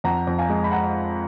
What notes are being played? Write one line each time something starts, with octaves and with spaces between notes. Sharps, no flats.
F2 F#5 A#5
F2
F5 G#5
G#3
B5
F#5 A#5